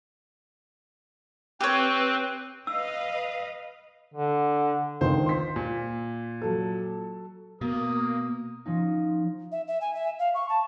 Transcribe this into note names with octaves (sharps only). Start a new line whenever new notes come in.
C4 G4 B4 C#5
B4 D#5 F5 E6
D3
C#2 D3 D#3 C5
C6 B6
A#2
F#3 A4
B2 A#3 A#4 D#6
F3 C#4 D#4
E5
E5
G#5
E5
F5
C#6
A5